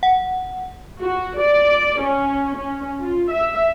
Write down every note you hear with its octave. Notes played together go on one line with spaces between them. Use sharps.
F#5
F#4
D5
C#4
C#4
F4
E5